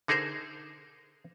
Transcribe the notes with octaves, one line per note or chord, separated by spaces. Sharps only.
D3 D#4 G#4 A#4 C5